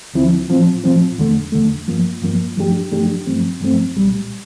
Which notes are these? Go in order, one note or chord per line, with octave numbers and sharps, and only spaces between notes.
D2 D3 F3 C4 E4
A2 F3 C4
A2 F3 C4
E2 D3 A3
E2 D3 A3
G2 F3 A#3
G2 F3 A#3
G2 F3 A3 D4 G4
G2 F3 A3 D4 G4
G2 F3 A3 C4
G2 F3 A3 C4
C2 A#2 G3